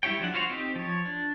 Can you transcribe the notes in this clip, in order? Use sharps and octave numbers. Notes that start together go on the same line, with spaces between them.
G3 E4 G4 C#5 G5
F3 F#3 D4 F#5
F4 F#4 C5 C#5 F5
C4 D#4 G4
F3 C#5
D4